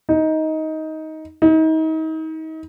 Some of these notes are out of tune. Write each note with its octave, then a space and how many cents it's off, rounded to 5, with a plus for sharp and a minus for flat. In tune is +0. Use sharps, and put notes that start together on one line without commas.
D#4 +15
D#4 +35